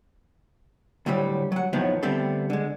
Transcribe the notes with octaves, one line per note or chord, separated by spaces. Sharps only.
D2 A2 F#3 G3
F#3 F#5
F2 A2 D#3 F3 F#3 B3
D3 G3 A3 B3 C4 D4
D3 G#3